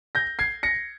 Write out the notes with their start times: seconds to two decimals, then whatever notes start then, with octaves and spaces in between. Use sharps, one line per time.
0.15 G6 A#6
0.39 G#6 C7
0.63 A#6 C#7